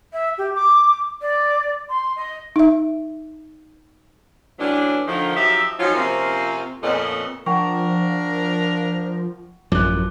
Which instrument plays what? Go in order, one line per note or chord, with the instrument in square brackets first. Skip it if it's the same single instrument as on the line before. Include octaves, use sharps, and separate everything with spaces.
[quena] E5
G4
D6
D5
C6
D#5
[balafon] D#4 E5
[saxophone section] A2 E3 F#3 C#4 D4
D3 D#3 F3
F3 F#3 D#4 G4 E5
F3 F#3 C4 C#4 D#4 F4
C3 F3 A#3 C4 C#4 F4
F2 A#2 B3 C#4 A4 D#5
[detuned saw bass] F3 [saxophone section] D4 A#4 [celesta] F#5 G5 C#6
[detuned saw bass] A1 [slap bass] F#2 F3 [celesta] D6 F#6